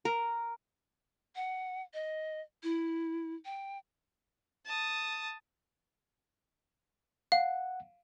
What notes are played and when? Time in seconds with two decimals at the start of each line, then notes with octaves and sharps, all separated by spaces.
0.05 A#4
1.36 F#5
1.94 D#5
2.63 E4
3.45 G5
4.65 A5 D#6
7.32 F5 F#5